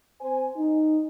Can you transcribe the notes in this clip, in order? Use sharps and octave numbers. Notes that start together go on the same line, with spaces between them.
C4 C5 G#5
D#4